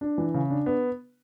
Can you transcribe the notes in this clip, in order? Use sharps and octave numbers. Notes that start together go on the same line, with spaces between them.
D4
E3
C#3
D4
B3